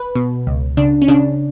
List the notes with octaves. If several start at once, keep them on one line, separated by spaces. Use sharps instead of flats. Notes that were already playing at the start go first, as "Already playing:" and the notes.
Already playing: B4
B2
C#2
C#3 D4
C#4
C#3 D4